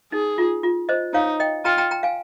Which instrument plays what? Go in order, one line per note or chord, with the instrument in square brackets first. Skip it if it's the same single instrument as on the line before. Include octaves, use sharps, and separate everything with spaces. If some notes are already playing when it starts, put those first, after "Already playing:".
[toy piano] D#4 [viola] G#4
[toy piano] F4
F4
C5 D#5
[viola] D#4 [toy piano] C#5 F5
[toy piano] D#5 G5
[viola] F4 [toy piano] G5 A#5
[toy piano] G5 A#5
G5 A#5
F5 G#5